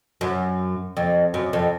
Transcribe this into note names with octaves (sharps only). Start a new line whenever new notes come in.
F#2
F2
F#2
F2